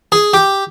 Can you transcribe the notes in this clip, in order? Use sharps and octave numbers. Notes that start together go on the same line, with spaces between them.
G#4
G4